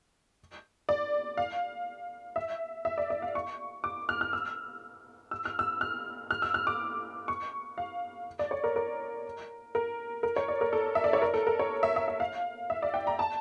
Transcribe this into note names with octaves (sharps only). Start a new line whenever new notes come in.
D5
F5
E5
E5
D5
D5
F5
C#6
D6
F6
F6
E6
E6
F6
E6
F6
F6
E6
F6
D6
C#6
F5
D5
C#5
A#4
A#4
A#4
A#4
C#5
D5
A#4
A4
E5
D5
C#5
A#4
A4
A#4
C#5
E5
E5
E5
F5
E5
D5
G5
A#5
A5